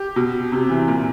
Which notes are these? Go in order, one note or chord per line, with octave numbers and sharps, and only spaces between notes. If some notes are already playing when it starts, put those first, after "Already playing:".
Already playing: G4
B2
C3
E3
A#2